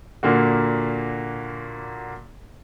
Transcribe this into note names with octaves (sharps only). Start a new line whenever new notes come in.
A#2 D3 A#3 F#4